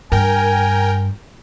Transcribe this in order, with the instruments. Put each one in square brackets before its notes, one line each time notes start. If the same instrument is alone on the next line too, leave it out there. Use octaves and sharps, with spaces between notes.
[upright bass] G2 [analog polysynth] A#4 G5 [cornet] G#5